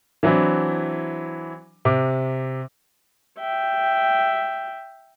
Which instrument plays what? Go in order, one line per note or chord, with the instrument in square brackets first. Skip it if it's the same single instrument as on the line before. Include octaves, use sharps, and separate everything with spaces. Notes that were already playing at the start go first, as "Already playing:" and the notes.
[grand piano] E3 F#3 C4 D4 E4
C3 D6
[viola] E5 G5